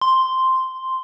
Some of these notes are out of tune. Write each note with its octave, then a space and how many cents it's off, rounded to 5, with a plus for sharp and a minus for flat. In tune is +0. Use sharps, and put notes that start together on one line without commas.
C6 -5